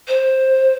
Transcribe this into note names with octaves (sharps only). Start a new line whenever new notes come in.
C5